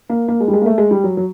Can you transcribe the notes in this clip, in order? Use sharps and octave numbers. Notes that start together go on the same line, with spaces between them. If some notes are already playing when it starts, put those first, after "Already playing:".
A#3
A#3
G#3
G3
G#3
A#3
A3
G#3
G3
F#3
F#3